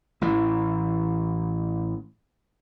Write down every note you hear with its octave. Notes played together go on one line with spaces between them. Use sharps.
A1 A2 E3